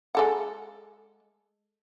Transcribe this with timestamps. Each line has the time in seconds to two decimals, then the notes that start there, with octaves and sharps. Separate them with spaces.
0.15 G#3 A4 F#5